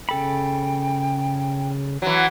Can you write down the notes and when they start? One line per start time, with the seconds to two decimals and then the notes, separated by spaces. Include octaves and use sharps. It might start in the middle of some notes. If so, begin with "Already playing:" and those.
0.09 C#3 A4 G5 B5
2.02 E3 F#3